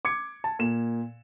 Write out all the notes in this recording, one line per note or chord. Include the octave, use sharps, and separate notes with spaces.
D6 G#6 C#7
A5
A#2 E7